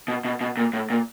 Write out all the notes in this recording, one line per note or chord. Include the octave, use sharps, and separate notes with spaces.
B2
B2
B2
A#2
A2
A#2